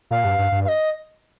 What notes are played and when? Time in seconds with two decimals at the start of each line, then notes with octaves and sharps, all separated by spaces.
0.11 A#2 F5
0.25 G2
0.38 G2
0.52 G2
0.65 F5
0.68 D#5